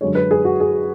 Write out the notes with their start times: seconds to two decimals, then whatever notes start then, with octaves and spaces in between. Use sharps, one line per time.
0.01 F#2 D3 G#3 C#5
0.15 B4
0.31 G#4
0.45 F#4
0.60 G#4